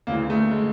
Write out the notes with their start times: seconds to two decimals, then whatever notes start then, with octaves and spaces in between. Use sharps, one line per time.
0.07 D2 C#3 E3 A#3
0.30 A3
0.51 G#3